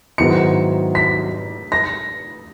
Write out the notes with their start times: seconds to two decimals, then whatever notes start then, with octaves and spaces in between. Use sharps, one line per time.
0.18 G#2 D#3 F#3 B3 E4 C#7
0.95 B6
1.72 A#6